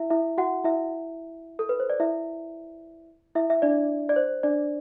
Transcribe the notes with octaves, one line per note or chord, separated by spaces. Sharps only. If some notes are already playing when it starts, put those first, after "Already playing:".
Already playing: E4 E5
E4 E5
F#4 F#5
E4 E5
A4
B4
C5
D5
E4 E5
E4 E5
E5
D4 D5
D5
C5
D4 D5